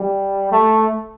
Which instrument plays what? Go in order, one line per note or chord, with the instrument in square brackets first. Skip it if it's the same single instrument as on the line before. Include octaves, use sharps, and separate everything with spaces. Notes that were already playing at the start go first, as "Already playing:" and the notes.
Already playing: [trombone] G3
A3